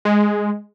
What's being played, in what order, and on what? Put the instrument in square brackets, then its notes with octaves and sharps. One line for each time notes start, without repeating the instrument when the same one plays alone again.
[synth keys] G#3